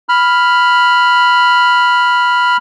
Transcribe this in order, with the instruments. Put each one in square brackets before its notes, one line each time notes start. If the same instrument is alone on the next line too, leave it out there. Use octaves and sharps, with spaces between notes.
[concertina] B5 F6